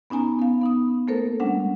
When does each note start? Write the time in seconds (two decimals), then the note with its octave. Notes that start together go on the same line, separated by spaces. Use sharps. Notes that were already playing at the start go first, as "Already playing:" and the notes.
0.10 B3 C#4 D#4 G#5 A#5
0.39 B3 F5
0.61 B3 D#4 D#6
1.08 A3 A#3 A4 A#4 C5
1.40 G3 G#3 C#4 D4 F#5